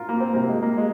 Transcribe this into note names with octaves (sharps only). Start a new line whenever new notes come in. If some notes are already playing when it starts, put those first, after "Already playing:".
Already playing: F4 A#4
A#3
C4
C3 G3 A#3
G#3
A#3
G#3